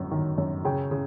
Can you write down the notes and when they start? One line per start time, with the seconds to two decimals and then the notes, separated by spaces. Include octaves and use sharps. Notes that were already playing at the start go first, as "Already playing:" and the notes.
Already playing: G1 F#2
0.11 D#3
0.38 F#2
0.65 C#3 G5
0.91 C#3